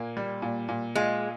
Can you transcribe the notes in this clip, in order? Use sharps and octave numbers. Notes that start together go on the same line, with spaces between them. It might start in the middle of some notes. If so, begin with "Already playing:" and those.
Already playing: A#2 A#3
G3
A#2
A#2
G#3 F4